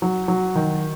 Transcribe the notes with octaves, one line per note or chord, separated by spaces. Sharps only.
F#3
F#3
D#3